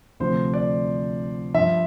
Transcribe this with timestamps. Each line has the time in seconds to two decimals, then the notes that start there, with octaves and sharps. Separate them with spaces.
0.20 D2 C3 F3 C5
0.54 D5
1.54 G2 F3 E5